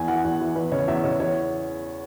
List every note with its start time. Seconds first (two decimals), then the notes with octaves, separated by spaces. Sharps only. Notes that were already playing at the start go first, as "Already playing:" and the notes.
Already playing: E2 G#5
0.08 E3 F#5
0.24 E2
0.41 E3
0.56 E2 B4
0.72 C#3 C#5
0.88 E2 E5
1.04 C#3 C#5
1.20 E2 C#5